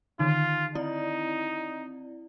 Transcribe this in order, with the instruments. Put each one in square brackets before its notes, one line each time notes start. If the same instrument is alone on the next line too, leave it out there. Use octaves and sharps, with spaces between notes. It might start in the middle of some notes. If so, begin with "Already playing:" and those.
[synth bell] D3 D#3 D#4 [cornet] F4
[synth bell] C4 E4 D5 [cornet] D#4